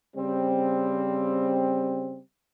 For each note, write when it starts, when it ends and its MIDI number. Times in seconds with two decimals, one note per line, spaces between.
0.15 2.19 49
0.15 2.19 55
0.15 2.19 60